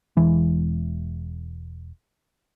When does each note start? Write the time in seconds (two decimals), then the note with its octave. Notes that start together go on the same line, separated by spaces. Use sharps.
0.17 E1 E3 G#3